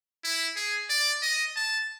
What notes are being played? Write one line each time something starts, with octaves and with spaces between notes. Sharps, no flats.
E4
G#4
D5
D#5
A5